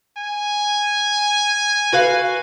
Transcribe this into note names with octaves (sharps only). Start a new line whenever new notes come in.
G#5
F#4 B4 F5